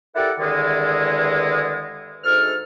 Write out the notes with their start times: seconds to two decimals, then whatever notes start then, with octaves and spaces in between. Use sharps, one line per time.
0.16 E4 G4 A4 A#4 D5 F#5
0.40 E2 G2 D3 D#3 G#3
2.24 D2 G#2 A4 F6